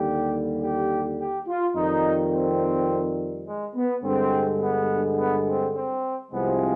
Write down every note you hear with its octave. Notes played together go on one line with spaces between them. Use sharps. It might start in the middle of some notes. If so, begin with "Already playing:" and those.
Already playing: D#2 D3 G3 G4
G4
G4
F4
F2 D#3 G3 D#4
C4
G#3
B3
G2 D3 G#3 C4
B3
B3
C4
C4
C2 C3 F3 G#3 B3